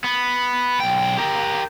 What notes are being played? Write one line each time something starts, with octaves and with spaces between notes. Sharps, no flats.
B3
B1 G5
G4 A#4